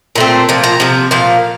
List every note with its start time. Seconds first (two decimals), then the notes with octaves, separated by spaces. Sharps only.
0.15 A#2 A3 C4
0.49 A#2 F3
0.64 A#5
0.80 C3 F3
1.11 A#2 F3 F5